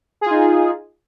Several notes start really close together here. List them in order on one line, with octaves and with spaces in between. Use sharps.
G#4 F4 D#4